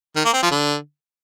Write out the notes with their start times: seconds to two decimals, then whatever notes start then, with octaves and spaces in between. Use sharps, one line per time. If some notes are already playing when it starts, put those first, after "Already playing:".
0.16 D#3
0.25 A#3
0.34 C4
0.43 F3
0.51 D3